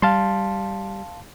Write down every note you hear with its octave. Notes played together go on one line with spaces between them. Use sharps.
G3 F5 A5 C6